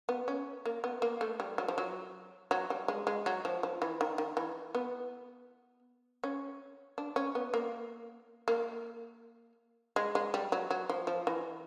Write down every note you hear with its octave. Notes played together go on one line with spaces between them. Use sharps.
B3
C#4
A#3
B3
A#3
A3
G3
F#3
F3
F#3
F#3
G3
G#3
G#3
F#3
F3
F3
E3
D#3
D#3
E3
B3
C#4
D4
C#4
B3
A#3
A#3
G#3
G#3
G3
F#3
F#3
F3
F3
E3